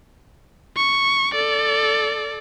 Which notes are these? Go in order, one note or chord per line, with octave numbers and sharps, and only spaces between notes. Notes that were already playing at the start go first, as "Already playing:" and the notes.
C#6
A4 D5